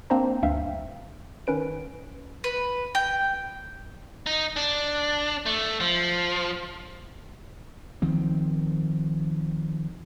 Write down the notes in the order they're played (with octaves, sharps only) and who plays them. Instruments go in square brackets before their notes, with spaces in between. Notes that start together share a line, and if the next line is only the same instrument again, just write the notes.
[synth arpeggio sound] A#3 C4 D4 C5 A#5
D2 G2 E5 F5 G5
D#3 C#4 B4 D7
[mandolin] B4
G5
[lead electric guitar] D#4
D4
A3
F3
[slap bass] D#3 F3 C4